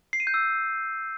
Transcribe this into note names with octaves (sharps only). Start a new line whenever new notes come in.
C7
D#7
G6
E6